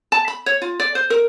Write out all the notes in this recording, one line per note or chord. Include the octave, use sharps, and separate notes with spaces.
A5
B5
C#5
F4
D5
C5
A#4